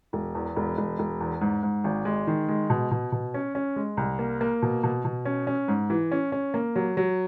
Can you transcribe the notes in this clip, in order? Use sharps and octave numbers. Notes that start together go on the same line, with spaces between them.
E1
E2
E1
E1
E1
E2
G#2
G#2
G#1
G#3
D#3
G#3
B2
B2
B2
C#4
C#4
G#3
C2
A#3
A#3
B2
B2
B2
C#4
C#4
G#2
E3
C#4
C#4
A#3
F#3
F#3